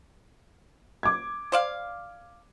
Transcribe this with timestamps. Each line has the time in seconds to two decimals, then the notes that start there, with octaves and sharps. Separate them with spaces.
1.03 D6 G#6
1.52 C5 D5 F5